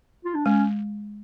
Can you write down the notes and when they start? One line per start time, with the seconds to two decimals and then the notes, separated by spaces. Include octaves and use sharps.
0.25 F4
0.35 D4
0.45 G#3 C#4